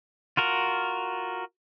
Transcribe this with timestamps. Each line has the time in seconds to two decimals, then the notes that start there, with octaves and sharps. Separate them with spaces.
0.37 F4 F#4 A#4